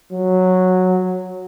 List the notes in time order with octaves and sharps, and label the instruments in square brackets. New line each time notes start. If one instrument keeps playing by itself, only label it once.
[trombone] F#3